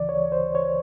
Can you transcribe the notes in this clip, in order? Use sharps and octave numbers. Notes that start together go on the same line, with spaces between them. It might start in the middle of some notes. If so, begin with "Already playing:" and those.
Already playing: D2 C#3 E3 D5
C#5
C5
C#5